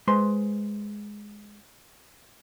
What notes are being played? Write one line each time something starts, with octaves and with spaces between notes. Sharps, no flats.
G#3 B4 C5 C6